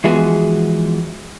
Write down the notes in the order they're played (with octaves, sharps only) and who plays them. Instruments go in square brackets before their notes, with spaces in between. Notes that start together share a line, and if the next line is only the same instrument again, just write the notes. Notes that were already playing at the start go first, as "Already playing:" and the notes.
[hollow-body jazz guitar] E3 F3 G#3 B3 F#4 G#4